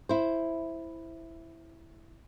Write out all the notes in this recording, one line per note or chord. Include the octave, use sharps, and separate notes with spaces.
E4 C5